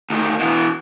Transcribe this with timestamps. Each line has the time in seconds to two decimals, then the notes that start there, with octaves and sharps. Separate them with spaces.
0.10 D2 D#3
0.39 B2 E3